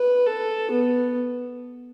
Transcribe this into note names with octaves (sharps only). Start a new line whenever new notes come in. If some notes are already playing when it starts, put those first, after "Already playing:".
Already playing: B4
A4
B3